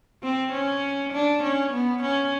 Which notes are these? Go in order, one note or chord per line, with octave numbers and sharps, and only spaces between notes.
C4
C#4
D4
C#4
B3
C#4